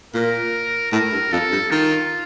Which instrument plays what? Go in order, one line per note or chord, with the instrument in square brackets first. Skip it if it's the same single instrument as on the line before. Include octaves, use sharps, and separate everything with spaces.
[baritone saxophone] A#2 [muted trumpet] A#4
[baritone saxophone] A2 [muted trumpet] A#4
[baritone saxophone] G2
[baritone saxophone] F2 [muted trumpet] A4
[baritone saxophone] G2
[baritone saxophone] D#3 [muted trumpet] F4